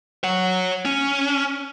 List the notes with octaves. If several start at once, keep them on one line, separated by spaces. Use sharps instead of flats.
C#5 F#5
C#4